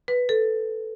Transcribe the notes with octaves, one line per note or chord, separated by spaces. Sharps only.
B4
A4